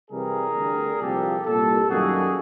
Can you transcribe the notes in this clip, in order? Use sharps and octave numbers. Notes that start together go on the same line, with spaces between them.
C2 C3 E3 G3 G#4 A#4
D2 D3 G3
C2 A#2 F3 A#3 G4 A4
C2 A#2 G3 G4 A4
F#2 D#3 G3 A#3 F#4 G#4